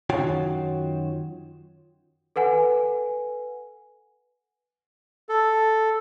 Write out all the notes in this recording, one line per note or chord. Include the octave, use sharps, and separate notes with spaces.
F#2 D#3 F4 F#4 C#5 G5
A4 B4 F#5 G#5
A4